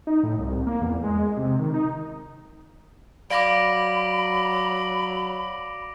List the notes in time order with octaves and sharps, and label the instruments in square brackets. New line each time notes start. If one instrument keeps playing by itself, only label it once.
[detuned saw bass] D#4
A2
C2
A#3
E2
G#3
C3
D#3
D#4
[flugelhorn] F#3 [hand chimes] D5 F5 [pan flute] B5 [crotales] D6 A#6 D7